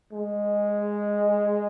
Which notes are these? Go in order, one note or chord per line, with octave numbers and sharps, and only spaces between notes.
G#3